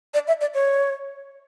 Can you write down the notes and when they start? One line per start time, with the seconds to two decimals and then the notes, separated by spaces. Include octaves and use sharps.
0.14 D5
0.27 E5
0.41 D5
0.54 C#5